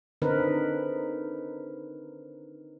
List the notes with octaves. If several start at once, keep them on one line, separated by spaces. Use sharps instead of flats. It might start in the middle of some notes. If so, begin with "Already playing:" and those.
D3 D#3 C4 D#4 A#4 B4